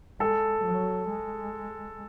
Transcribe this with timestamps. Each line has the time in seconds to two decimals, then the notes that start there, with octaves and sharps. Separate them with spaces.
0.20 G#3 A4
0.65 F#3
1.09 G#3